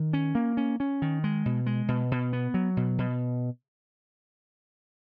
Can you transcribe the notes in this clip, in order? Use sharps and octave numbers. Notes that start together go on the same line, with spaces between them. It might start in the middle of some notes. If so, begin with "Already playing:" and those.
Already playing: D#3
C#4
A#3
C#4
C#4
D#3
G#3
B2
G#3
B2
B2
B3
F#3
B2
B2